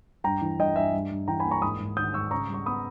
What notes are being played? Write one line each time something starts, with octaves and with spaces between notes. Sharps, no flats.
G2 G5 A#5
E3
G2 D#5 G5
G2 E5 G#5
G2
G2
E3 G5 A#5
G#5 B5
A#3
A#5 C#6
G#2 B5 D#6
G#2
D#3 D#6 G6
G#2 C#6 E6
C#3 A#5 C#6
G3 C#6
B3 B5 D#6